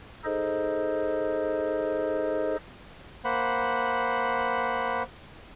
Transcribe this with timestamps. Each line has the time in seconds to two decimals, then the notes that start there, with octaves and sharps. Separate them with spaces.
0.24 D#4 G#4 A4 C5 D#5
3.25 A#3 C5 F#5 B5